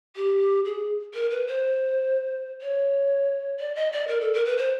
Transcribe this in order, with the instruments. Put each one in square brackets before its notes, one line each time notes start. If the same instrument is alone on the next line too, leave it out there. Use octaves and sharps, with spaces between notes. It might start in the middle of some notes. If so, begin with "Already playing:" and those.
[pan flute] G4
G#4
A#4
B4
C5
C#5
D5
D#5
D5
A#4
A4
A#4
B4
C5